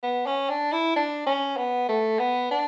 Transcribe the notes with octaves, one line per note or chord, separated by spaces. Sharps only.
B3
C#4
D4
E4
D4
C#4
B3
A3
B3
D4